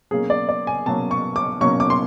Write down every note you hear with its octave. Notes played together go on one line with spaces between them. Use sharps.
B2 F#3 A#3 C#4 G#4
D5
D5
G#5
B2 F#3 A#3 C#4 A5
C#6
D6
B2 F#3 A#3 C#4 C#6
D6
C6